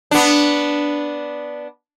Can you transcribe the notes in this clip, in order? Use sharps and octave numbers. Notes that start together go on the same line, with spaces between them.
B3 D4